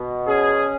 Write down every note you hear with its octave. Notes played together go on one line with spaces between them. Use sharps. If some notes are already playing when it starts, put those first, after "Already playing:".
Already playing: B2
C#4 G#4